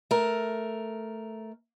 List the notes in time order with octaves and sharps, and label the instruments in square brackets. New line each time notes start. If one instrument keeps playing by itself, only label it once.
[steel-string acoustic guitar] A3 A#4